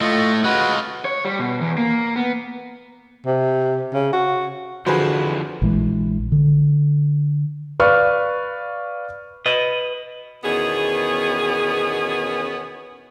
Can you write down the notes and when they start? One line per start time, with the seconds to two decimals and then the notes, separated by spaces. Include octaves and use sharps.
0.01 A2 A3 F4 D#5
0.44 G#3 F4 F#4 B4
1.05 C#5
1.25 G3
1.39 B2
1.61 E2
1.78 A#3
2.16 B3
3.26 C3
3.94 C#3
4.13 F#4
4.87 F2 D3 E3 F3 F#4 G#4 B4 C5
5.62 A#1 E3 G#3
6.32 D3
7.80 B4 D5 F5 C#6 F6
9.46 B4 D#5
10.44 E2 B2 D#3 B3 C#4 G#4